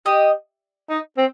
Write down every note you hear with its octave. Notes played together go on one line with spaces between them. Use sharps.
G4 D#5
D#4
C4